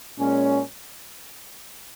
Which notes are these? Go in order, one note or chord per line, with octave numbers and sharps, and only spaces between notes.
A#2 G#3 C#4